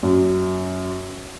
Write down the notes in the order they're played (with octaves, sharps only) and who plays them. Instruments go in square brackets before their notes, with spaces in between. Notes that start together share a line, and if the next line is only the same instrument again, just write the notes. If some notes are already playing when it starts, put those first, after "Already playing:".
[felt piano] F#2